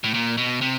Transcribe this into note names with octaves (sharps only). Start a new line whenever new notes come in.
A2
A#2
B2
C3